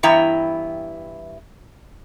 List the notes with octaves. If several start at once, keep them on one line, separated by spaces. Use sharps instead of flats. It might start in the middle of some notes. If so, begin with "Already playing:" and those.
G2 E3 B3 E4 G5 A#5